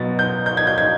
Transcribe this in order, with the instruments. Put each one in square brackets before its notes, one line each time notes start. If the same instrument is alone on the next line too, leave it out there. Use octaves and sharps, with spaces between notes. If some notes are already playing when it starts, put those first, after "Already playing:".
Already playing: [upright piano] B2 F#3 B3 A6
G6
G6
G#6
G6
G#6